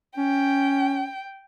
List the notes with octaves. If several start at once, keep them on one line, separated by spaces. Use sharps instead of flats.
C#4 G5